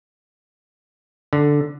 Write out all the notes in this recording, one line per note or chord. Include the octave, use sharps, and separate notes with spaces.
D3